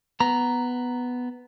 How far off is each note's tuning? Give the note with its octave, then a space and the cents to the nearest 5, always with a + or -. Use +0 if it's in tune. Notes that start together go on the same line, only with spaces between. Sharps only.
B3 +5 A#5 +0